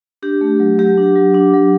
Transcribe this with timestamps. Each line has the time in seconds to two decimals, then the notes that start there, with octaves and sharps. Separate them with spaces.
0.22 D4 G4
0.41 A3
0.60 F#3
0.79 F#3 G4
0.98 D4
1.16 F#3
1.34 D4
1.54 F#3